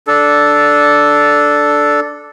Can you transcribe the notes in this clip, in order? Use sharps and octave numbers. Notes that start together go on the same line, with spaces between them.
D4 A4